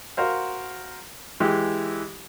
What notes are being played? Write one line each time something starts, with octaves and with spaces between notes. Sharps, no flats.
F#4 A#4 C5 F5
E3 G#3 G4